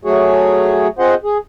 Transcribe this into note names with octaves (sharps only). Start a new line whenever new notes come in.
F#3 A3 F#4 G#4 C#5
C4 F4 G#4 C5 D#5 F#5
G#4